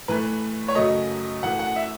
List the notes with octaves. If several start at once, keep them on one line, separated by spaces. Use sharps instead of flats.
A2 E3 A3 B4
C#5
F#2 C#3 F#3 A3 D#5
F#2 E3 A3 F#5
F#5
E5